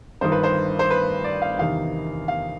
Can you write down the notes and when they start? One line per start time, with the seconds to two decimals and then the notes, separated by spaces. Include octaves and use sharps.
0.21 G1 G2 D#3 C5
0.32 B4
0.44 C5
0.79 C5
0.91 B4
1.24 D5
1.42 F5
1.59 E2 C3 D#3 F5
2.28 F5